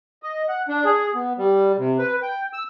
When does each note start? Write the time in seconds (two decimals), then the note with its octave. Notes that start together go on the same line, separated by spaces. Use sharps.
0.23 D#5
0.49 F#5
0.68 D4
0.85 G#4
1.15 B3
1.38 G3
1.78 C3
1.98 B4
2.22 G5
2.53 E6